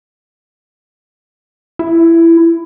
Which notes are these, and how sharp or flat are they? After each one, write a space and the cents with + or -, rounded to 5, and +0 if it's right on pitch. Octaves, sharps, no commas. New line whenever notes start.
E4 +15